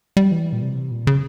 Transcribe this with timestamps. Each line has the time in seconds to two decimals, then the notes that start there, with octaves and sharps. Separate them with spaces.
0.17 G3
0.32 E3
0.53 A#2
0.62 C3
0.91 A#2
1.07 C#3